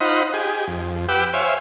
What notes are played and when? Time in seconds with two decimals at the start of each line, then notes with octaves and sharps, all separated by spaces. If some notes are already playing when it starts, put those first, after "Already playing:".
0.01 D#4 F4 C5 D#5 F#5 B5
0.34 G4 G#4
0.68 F2
1.09 G4 B4 F#5 G5 D6 E6
1.34 C5 C#5 E5 F5 G#5